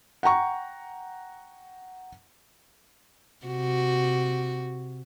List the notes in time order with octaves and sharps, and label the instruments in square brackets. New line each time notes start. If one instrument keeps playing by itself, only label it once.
[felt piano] F#5 G5 A#5 C#6
[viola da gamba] C3 F#4